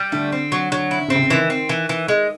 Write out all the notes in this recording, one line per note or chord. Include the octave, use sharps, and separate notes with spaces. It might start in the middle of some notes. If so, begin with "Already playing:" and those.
Already playing: G3
D3 A3
C4
F#3
D3 F#3
E4
D3
C#3 C4
C3
C#3
D#3 E3
C4
E3
E3
G#3